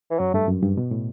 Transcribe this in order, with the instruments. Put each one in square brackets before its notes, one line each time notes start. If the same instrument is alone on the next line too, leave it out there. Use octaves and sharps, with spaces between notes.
[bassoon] E3
[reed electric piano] F#2 [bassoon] F#3
[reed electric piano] G2 [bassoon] A3
[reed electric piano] F#2
G2
B2
A2